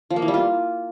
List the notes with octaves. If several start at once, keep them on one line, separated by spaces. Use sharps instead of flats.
F3
A#3
E3
G3
F4